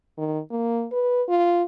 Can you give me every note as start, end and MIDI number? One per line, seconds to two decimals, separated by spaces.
0.18 0.39 51
0.51 0.86 58
0.92 1.23 71
1.29 1.63 65